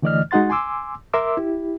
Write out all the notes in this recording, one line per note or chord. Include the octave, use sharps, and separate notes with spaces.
D3 E3 A3 D5 D#5 F6
G#3 D#4 F#4 F#5 C6 A6
G#5 C6 D6 E6
A#4 E5 C6 D6 E6
E4 G4